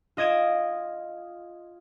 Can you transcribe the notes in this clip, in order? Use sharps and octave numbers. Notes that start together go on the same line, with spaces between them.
F4 D#5 G#6 D7 E7